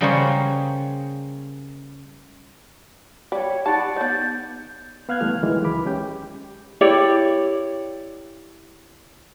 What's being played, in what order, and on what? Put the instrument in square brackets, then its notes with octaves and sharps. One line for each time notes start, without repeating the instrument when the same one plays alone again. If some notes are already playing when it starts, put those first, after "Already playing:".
[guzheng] C#3 G3 A#3 G#4 C5 C#5
[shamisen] G3 D5 [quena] C#5
[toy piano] D#4 G4 B5 [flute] D5 [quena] F#5 [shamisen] A5
[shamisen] B3 D#4 [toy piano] C#5 [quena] G6
[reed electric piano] B3 F5 F6 F#6 G#6
C2 E3 G3 A3 F6
D#3 E3 F#3 G#3
C#2 B5 D6
G#3 C#4 G4 G5
[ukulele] E4 G4 C#5 D5